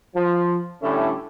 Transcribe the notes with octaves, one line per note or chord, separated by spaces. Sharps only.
F3
A2 D3 G3 A3 C#4 E4